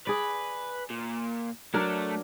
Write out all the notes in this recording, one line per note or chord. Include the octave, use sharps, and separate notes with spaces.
G#4 B4 D5
A#2
F#3 A3 D4 A4 A#4